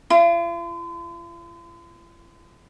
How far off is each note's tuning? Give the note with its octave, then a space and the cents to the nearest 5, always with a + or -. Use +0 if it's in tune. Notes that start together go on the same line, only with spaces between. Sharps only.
F4 -45